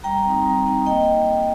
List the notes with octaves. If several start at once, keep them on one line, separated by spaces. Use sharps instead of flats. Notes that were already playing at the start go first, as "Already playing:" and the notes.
G3 G5 A#5
C4 D#4
G3
C4 D#4
A#3 D#5 G5